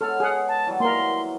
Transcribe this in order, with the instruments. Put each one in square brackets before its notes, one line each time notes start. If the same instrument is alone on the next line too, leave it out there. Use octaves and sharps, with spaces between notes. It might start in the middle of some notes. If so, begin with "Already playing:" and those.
[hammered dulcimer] G#3 B3 C#5 [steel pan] A4 [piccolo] F6
[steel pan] G#4 F#5
[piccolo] A5
[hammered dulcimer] E3 F#3 G3
[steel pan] A#3 A#4 [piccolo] C6